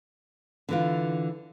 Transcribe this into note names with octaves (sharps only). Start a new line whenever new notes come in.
D3 E3 F4